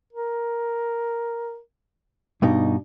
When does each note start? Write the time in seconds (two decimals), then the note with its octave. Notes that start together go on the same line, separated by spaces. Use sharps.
0.13 A#4
2.42 G2 B2 D4 D#4